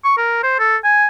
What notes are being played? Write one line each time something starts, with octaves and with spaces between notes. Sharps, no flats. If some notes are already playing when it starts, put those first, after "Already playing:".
C#6
A#4
C5
A4
G#5